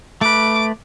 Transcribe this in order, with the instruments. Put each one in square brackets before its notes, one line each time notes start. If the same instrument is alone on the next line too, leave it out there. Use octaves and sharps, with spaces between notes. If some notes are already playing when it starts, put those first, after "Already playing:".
[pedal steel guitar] A3 B4 [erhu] D6